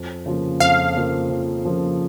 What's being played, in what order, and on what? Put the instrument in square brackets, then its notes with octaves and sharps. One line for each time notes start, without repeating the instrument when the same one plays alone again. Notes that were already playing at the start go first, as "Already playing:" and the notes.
Already playing: [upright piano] F2
C#3 F3 A#3
[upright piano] F2 [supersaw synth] F5
[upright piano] C#3 F3 A#3
F2
C#3 F3 A#3